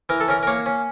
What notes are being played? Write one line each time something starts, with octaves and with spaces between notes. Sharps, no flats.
E3 A#4
A4
C#4 A#4
A#4
A#3 C#5
C#4